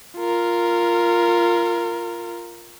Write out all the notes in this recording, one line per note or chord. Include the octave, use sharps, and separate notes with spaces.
F4 A#4